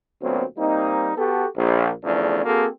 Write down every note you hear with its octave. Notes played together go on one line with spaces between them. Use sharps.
D2 A#2 F#3 B3 C4
G3 A#3 C4 D#4
B3 F#4 G4 A4
A#1
E2 C#3 F3 A3 D4
A#3 C4 F#4 G#4 A4